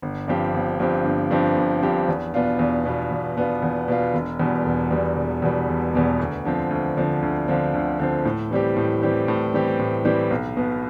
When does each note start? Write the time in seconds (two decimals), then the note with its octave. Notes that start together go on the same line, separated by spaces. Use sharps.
0.02 G1
0.28 G2 F3 C4 G4
0.54 G1
0.80 G2 F3 C4 G4
1.05 G1
1.31 G2 F3 C4 G4
1.56 G1
1.82 G2 F3 C4 G4
2.08 E2
2.34 B2 B3 D4 F4
2.59 E2
2.85 B2 B3 D4 F4
3.11 E2
3.37 B2 B3 D4 F4
3.63 E2
3.88 B2 B3 D4 F4
4.14 E1
4.40 E2 B2 G3
4.66 E1
4.91 E2 B2 G3
5.17 E1
5.42 E2 B2 G3
5.68 E1
5.94 E2 B2 G3
6.19 D2
6.45 D3 F3 C4
6.71 D2
6.97 D3 F3 C4
7.22 D2
7.48 D3 F3 C4
7.74 D2
7.99 D3 F3 C4
8.25 A2
8.51 E3 G3 C4 G4
8.77 A2
9.02 E3 G3 C4 G4
9.28 A2
9.54 E3 G3 C4 G4
9.79 A2
10.05 E3 G3 C4 G4
10.31 B1
10.57 B2 B3